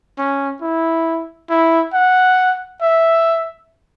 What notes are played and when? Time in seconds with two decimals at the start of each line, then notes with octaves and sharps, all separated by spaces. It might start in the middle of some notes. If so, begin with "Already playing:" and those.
0.18 C#4
0.62 E4
1.50 E4
1.94 F#5
2.82 E5